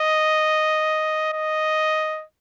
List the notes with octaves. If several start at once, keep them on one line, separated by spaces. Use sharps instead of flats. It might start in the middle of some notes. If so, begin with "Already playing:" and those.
Already playing: D#5
D#5